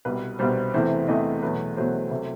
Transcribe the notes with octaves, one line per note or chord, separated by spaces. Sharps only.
C2 B2 G3 B4
C2 B2 G3 C5
E2 C3 E3 A3 C5
E2 C3 E3 A3 D#5
E2 B2 F#3 A3 B4
E2 B2 F#3 A3 C5
C2 C3 F#3 A3